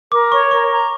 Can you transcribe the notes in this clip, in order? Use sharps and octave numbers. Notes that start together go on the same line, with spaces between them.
A#4 D6
C#5 C#6
A#4 C#6
A#5